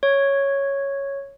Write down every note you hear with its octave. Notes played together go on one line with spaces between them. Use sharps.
C#5